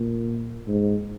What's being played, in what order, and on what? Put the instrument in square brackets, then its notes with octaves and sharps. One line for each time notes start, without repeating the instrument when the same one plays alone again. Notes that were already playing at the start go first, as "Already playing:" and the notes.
Already playing: [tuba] A#2
G#2